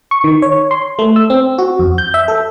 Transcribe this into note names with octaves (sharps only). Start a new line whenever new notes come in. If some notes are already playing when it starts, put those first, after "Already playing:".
C#6
D#3
C#5
C6
A3
E6
C4
F#4
F2
G6
E5
A4